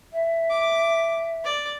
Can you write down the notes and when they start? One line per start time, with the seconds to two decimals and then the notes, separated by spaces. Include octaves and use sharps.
0.13 E5
0.50 D6
1.44 D5